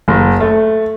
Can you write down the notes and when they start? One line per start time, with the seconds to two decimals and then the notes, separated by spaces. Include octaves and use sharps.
0.08 F#1
0.40 A3